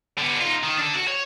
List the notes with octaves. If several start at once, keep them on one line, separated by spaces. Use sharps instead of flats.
D3 B3
D#4 F4
D#3
D4 A4
F#4
C#5